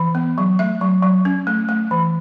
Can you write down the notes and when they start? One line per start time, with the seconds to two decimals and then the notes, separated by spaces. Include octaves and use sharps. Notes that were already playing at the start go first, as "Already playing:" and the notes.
Already playing: E3
0.15 B3
0.38 F#3
0.59 A3 E5
0.81 F#3
1.03 F#3
1.25 C#4
1.47 A3
1.69 A3
1.91 E3